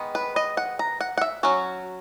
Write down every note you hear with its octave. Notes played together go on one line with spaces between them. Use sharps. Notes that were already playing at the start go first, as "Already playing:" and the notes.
Already playing: D#3 G#3 B3
B4
D#5
F#5
A#5
F#5
F#5
E5
F#3 C#4 F#4